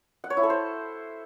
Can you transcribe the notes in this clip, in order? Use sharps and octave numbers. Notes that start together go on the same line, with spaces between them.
F#5
C#5
E4
A4
C5